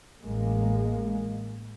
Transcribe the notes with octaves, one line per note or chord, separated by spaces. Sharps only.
A1 G#3 A#3